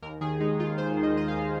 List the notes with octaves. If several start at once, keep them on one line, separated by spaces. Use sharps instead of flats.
D#2 A#4
D#3 G#4
G#3 D#4
D#2 F4
D#2 C5
D#3
D#5
G#3 D#5
F5
D#2